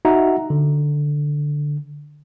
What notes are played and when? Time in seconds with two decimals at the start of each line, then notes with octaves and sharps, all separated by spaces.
0.05 D#4 F#4 E5 F#5 A#5
0.50 D3